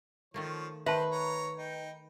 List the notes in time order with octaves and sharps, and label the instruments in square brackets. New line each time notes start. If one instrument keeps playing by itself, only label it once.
[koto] D#3 A3 A#3 [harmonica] F3 C#5
[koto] D#3 [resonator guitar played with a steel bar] B4 [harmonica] C5 [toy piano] E5 A5
[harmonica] C#5 A#5
D#4 G5